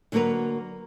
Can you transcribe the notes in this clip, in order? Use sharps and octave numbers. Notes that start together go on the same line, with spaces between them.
D3 F#3 A#3 F#4 A#4 B4